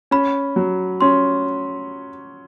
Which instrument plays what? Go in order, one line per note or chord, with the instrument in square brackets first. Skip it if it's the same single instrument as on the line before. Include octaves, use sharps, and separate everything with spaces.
[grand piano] C#4 [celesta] B5
[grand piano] F#3
[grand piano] C#4 [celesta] C6